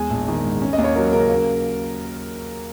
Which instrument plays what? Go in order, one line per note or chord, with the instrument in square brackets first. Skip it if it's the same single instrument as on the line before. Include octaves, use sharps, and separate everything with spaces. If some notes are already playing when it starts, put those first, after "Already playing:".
Already playing: [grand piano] E2 G#3 G#5
A#1
D#3
G#2
C#4
D#5
D#2
C#5
F#3 A#4
C#3 A#4
A#3